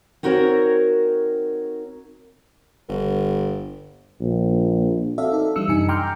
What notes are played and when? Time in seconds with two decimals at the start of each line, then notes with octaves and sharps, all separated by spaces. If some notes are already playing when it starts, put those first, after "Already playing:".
0.23 C4 D#4 F#4 A#4 C#5
2.89 G1
4.21 A#1
5.18 C4 F#4 A4 D5 E5 F5
5.32 D#4 A4
5.56 E3 G3 D4 E6 C#7
5.68 F#2 C3 D#4 G#5 C#7
5.88 G5 A#5 C6 D6 F6 G6